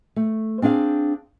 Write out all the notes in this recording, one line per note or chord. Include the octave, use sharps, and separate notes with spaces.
A3
C4 D4 G#4 F5